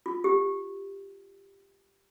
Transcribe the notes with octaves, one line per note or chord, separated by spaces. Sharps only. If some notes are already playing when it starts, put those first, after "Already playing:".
F4
G4